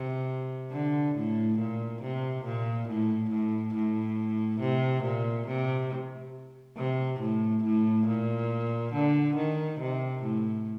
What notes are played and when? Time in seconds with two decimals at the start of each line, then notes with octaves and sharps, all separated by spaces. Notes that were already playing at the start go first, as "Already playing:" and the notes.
Already playing: C3
0.72 D3
1.15 A2
1.58 A#2
2.02 C3
2.45 A#2
2.89 A2
3.31 A2
3.75 A2
4.61 C3
5.04 A#2
5.47 C3
6.77 C3
7.20 A2
7.64 A2
8.07 A#2
8.93 D3
9.36 D#3
9.80 C3
10.23 A2